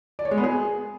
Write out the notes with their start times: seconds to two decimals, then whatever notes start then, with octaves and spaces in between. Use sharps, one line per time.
0.19 D5
0.25 C#5
0.31 G#3
0.37 B3
0.44 G#4